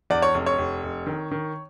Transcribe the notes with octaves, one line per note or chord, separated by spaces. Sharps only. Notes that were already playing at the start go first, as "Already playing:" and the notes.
E2 D5
C#5
F1
C#5
F1
F1
D#3
D#3